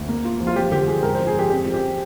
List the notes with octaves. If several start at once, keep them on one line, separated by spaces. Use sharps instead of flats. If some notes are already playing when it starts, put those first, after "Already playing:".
Already playing: D2
A#3
F4
F3
F4
F3 G4
D3 G4
F3 G#4
G#2 A#4
C5
F3
G#4
F3 G4
F2 G4
F3
G4